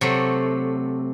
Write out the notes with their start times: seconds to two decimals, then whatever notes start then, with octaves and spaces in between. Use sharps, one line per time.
0.01 C3 F#3 A3